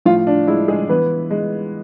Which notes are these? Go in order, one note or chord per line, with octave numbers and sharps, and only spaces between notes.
A2 F3 F4
D4
G#3 E4
G#3 G#4
E3 B3 B4
G#3